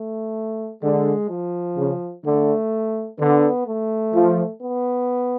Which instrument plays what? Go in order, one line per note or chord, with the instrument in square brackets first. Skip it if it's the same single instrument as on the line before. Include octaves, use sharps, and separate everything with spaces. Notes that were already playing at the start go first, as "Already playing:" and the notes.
Already playing: [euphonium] A3
[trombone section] D3 [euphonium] G#3
[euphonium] F3
[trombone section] C#3
[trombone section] D3 [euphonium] A3
[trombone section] D3 [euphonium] B3
[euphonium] A3
[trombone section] F3
[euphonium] B3